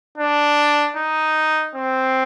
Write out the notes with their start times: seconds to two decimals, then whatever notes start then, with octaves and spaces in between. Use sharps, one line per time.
0.18 D4
0.97 D#4
1.75 C4